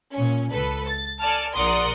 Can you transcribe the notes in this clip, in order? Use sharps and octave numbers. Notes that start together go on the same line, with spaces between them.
A#2 C#4
C#2 A4 B4
A6
A4 D5 G#5 A5 F6
A#1 A#4 D5 F#5 C6 D#6